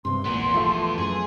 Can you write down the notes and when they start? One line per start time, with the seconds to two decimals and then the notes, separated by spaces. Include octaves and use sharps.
0.05 G2 C3 C6
0.25 E1 A#1 A#2 E3 B3
0.54 F3 A3
0.98 F#2 G#4